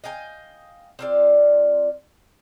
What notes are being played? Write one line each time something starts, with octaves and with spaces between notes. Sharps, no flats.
D#5 F5 G5 G#5
C4 F4 D5